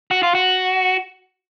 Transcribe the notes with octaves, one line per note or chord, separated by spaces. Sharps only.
F#4
F4
F#4